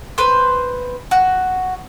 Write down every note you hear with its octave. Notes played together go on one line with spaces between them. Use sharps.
B4 C5
F#4